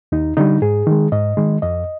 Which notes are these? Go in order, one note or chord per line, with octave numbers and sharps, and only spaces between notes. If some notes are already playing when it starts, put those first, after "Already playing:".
D#2 D#4
D3 G3 D#4
G#2 G#4
D#3 G#3
G#2 D#5
D#3 G#3
F2 D#5